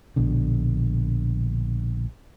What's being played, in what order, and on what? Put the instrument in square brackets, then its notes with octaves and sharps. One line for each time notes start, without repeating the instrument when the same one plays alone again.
[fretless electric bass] A#1 B2 D3